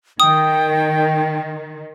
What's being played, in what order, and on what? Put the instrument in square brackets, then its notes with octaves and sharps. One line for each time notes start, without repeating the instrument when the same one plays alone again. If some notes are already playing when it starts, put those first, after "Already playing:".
[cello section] D#3 [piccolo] G5 [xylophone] D#6